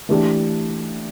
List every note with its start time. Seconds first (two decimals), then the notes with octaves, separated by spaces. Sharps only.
0.09 E3 A3 D4 G4